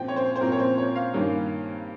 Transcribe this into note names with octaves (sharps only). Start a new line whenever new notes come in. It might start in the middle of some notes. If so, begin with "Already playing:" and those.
Already playing: A#2 F3 C4 G5
C#5
C5
C5
A#2 F3 C4 A#4
C#5
C5
C#5
F5
G2 D#3 A#3 C#4